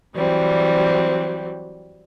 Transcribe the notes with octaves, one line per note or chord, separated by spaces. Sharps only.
E3 F#3 G3 C4